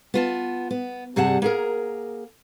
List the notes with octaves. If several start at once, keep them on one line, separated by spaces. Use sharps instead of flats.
B3 F4 A5
B3
G2 C3 G3 G#4 F#5 A5
A#3 G#4 A#4